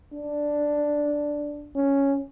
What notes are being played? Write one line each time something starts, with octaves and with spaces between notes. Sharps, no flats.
D4
C#4